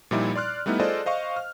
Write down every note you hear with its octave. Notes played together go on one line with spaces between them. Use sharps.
A#2 F3 G3 D#4 E4
D5 C6 F6 F#6
G3 A3 B3 D#4 E4
F4 G#4 A4 C5 D5 D#5
C5 D#5 F5 C#6
F6